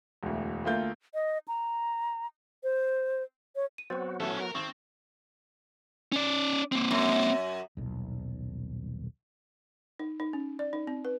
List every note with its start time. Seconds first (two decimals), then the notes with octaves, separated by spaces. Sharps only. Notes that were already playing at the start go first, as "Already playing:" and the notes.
0.23 E1 D2
0.65 D2 A3 A#3 F4 G6
1.14 D#5
1.48 A#5
2.63 C5
3.56 C#5
3.78 D#7
3.90 F#3 B3 C4 F#4 C5 A6
4.20 A3 C#4 E4 A4
4.40 A#4
4.55 G#1 C4 C#6
6.12 C#4 D5
6.72 A#3 C4
6.91 F#2
7.77 D#1 B1
9.99 D#4
10.20 D#4
10.33 C#4
10.59 D5
10.73 D#4
10.87 C4
11.05 B4